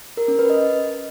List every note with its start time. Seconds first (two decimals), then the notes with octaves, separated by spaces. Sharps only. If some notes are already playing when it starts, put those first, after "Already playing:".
0.17 A#4
0.28 C#4
0.39 B4
0.50 D#5